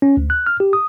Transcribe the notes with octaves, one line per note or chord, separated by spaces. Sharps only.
C#4
D2
F#6
F6
G4
D#6